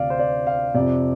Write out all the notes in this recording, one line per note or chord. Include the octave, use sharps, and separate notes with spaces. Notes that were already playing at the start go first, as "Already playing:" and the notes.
Already playing: D2 C3 D5 F5
C5
D5
F5
F2 C3 D5